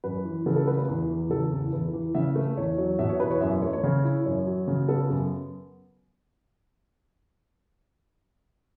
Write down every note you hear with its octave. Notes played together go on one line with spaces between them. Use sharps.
F#2 B4
E3
C#3 A4
A4
A3 B4
B4
E2 B4
E3
C#3 A4
E2
E2 B4
E3
C#3 E5
A3
E2 C#5
F#3 C#5
B2 E5
C#5
E2 B4
C#5
F#2 E5
E5
A3 C#5
C#5
C#3
E4
F#2 C#5
F#3
C#3
B3 A4
F#2